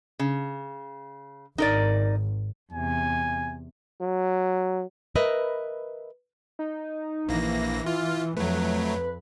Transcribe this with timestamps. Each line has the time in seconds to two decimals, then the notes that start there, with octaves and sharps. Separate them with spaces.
0.19 C#3
1.58 G#1 D#4 A#4 D5
2.73 E2 C3 G#5
4.01 F#3
5.16 A#4 B4 D#5 E5
6.59 D#4
7.29 A#1 E3 A#3 A#6
7.86 F4 F6
8.37 F2 F#3 A3 B4